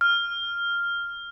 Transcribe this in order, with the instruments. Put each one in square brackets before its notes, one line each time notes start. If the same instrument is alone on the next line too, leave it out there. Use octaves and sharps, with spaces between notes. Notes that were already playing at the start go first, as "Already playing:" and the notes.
[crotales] F6